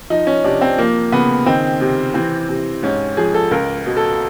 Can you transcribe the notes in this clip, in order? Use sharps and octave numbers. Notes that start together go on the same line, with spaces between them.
F3 D#4
C#4
C3 D4
C4
F3 A#3
C#3 B3
D#3 C4
C3
E3 C4
C3
G#2 C#4
F3 G#4
A4
C#2 A#4
B2
A4